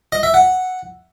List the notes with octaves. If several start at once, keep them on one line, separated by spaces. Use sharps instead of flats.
D#5
E5
F#5